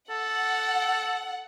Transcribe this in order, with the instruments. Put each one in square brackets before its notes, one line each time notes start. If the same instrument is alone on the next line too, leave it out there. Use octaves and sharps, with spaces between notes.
[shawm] A4 [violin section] F#5